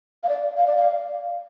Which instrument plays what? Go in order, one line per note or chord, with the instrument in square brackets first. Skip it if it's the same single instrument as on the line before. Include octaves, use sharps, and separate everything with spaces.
[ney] F5
D5
F5
D5
F5